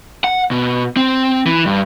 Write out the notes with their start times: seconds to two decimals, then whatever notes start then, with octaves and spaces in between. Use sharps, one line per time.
0.24 F#5
0.51 B2
0.97 C4
1.46 E3
1.66 G2